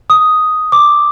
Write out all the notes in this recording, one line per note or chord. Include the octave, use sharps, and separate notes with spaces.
D#6
D6